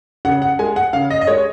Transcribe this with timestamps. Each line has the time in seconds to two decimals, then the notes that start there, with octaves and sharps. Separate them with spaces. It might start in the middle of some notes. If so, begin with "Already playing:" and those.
0.25 C#3 F#5
0.42 F#5
0.59 G#3 G#5
0.76 F#5
0.93 C#3 F5
1.10 D#5
1.21 D#5
1.27 G#3 C#5